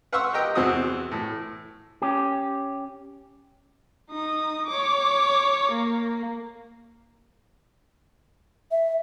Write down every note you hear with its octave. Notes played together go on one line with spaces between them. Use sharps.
B4 F5 F#5 C6 C#6 E6
G4 A#4 D#5 G5
E2 C3 E3 C4 F#4 D#6
A2 E3
C#4 G4
D#4 D#6
C#5 D6
A#3
E5